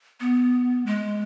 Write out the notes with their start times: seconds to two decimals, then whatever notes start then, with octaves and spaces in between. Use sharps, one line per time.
0.20 B3
0.86 G#3